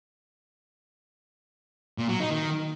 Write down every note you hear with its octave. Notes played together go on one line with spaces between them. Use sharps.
A#2
F#3
D#4
D#3